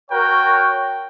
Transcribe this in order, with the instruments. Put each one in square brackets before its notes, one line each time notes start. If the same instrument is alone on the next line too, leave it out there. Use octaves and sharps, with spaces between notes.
[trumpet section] F#4 A#4 C#5 G5